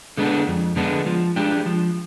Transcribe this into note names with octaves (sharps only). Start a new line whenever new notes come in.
D3 G#3 B3 D4
F2
D3 G#3 B3 D4
F3
G#3 D4 G4
F3